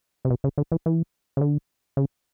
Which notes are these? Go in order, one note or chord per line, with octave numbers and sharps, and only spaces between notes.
C3
B2
C#3
D3
E3
E3
C#3
D3
C#3